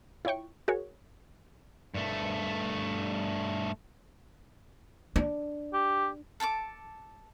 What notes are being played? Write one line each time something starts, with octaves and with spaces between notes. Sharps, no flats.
E4 F4 C#5 G5 C#6
F#4 G#4 A#4 C#5
G2 A3
D4
G4
A4 A5 C#6 D6